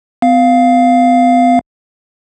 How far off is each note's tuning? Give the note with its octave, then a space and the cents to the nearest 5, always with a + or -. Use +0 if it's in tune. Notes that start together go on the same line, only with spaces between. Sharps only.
B3 +45 F5 +0